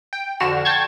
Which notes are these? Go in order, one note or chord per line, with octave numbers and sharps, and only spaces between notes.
G5
F2 D3 F#4 F6 E7
G5 A5 C6 C#6 G#6